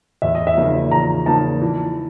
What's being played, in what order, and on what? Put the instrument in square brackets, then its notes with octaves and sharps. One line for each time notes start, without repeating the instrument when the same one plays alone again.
[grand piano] E2 [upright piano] E5
[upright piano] D#5
E5
[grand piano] C#3 F3 A#3 D#4
[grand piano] E2 [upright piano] A#5
[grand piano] C#3 F3 A#3 D#4 [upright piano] A5
[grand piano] E3